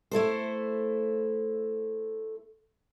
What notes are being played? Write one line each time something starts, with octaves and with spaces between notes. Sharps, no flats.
A3 E4 A4 C5